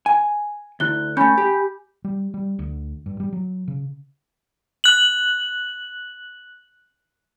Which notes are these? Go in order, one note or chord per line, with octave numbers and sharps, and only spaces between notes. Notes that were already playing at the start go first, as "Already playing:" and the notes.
G#5
D2 E4 F#6 G7
A3 C#4 G#5 B5 G6
G4
G3
G3
D2
G2
G3
F#3
C#3
F#6 F#7